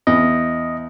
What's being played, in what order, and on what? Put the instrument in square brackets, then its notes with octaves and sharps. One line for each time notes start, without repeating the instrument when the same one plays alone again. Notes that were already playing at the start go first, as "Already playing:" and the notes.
[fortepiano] E2 [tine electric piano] D#5